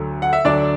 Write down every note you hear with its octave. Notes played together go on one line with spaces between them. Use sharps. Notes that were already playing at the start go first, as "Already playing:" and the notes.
Already playing: D2 D3 F#3
F#5
E5
D2 D3 F#3 D4 D5